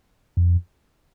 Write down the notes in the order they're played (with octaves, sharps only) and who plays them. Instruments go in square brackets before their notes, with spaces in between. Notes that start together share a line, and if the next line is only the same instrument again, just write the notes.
[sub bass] F2